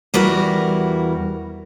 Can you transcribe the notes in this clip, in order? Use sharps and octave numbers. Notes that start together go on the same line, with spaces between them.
E2 G3 E4 F#4 A#4